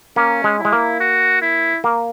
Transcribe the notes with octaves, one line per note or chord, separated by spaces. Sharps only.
A#3 C#4
G#3
E4
G#3
A#3
F#4
E4
A#3